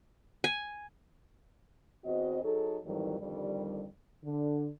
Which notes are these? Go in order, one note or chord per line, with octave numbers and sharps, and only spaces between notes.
G#5
E2 C4 F#4 C5 D#5
F#3 D#4 G#4 A4
F2 G#2 D#3 E3 F#3 G3
F2 D3 D#3 G3
D3